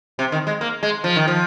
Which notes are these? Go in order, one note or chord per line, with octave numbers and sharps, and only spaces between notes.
C3
D#3
G#3
A#3
G#3
F3
D#3
F3